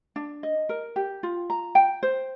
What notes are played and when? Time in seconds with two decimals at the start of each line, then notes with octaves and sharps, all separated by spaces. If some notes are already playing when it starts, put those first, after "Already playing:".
0.16 D4
0.43 D#5
0.69 A#4
0.96 G4
1.23 F4
1.50 A#5
1.75 G5
2.03 C5